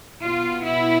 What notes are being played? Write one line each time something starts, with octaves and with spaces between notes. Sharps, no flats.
B2 B3 F4
E4